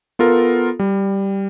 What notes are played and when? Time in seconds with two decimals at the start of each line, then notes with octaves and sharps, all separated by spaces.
0.19 B3 F4 A4 A#4
0.79 G3